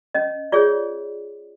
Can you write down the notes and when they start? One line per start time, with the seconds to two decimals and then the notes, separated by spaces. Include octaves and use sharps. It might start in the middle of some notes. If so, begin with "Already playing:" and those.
0.14 C#4 D#5
0.52 F4 G#4 C#5 D5